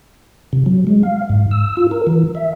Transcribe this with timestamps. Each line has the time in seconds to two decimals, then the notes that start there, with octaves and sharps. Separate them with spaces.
0.53 C3
0.66 F#3
0.87 G#3
1.03 F5
1.29 G#2
1.51 E6
1.77 F4
1.91 A#4
2.07 E3
2.35 E5